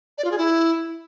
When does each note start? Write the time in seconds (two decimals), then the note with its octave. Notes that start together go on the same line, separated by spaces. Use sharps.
0.18 D5
0.25 F4
0.31 G#4
0.38 E4